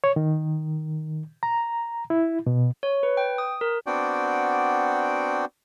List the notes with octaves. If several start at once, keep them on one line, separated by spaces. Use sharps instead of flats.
C#5
D#3
A#5
E4
B2
C#5
B4
G5
D#6
A#4
B3 C4 D4 F#4 D5 G5